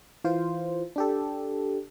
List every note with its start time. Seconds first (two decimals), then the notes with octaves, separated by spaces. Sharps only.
0.24 E3 F4 C5
0.96 D4 G4 A4